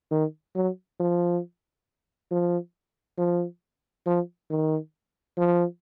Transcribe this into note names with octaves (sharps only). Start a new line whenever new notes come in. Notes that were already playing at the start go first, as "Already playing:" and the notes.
D#3
F#3
F3
F3
F3
F3
D#3
F3